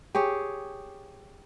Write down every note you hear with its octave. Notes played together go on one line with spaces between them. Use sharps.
G4 G#4 C#5